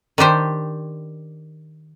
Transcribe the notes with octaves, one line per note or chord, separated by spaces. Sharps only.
D#3 D4 G4 C5